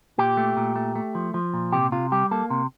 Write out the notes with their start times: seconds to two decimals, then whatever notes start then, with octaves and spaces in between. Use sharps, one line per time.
0.18 A#2 G4
0.37 A3
0.57 A#2
0.76 A3
0.95 A3
1.15 F3
1.34 F3
1.54 A#2
1.73 C3 G4
1.92 C3 F4
2.12 G3 G4
2.31 A#3 A4
2.50 C3